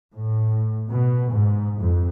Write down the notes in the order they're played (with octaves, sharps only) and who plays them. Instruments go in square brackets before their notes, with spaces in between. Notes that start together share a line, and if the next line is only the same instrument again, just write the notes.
[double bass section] A2
B2
G#2
F2